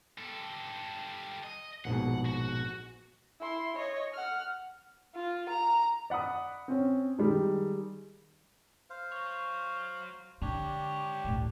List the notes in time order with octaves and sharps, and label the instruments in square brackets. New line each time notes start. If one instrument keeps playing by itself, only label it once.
[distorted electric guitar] G3 A4
D#5
[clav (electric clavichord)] A#1 G#2 B2 [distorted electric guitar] F#5
[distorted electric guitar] F#4
[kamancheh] E4 C6
C#5 D#5
F#5 F6
F4
A#5
[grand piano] D5 F#5 B5 D#6
C4 C#4
D#3 G3 G#3
[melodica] C5 F5
[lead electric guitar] F#3 C#5
[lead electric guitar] G#2 C#5 [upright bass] D3 [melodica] D4 G4
[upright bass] A1 D2